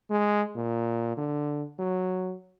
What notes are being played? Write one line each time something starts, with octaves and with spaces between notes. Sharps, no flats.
G#3
A#2
D3
F#3